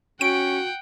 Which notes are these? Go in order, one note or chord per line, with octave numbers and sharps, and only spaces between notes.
C#4 F#4 F#5 G5 D7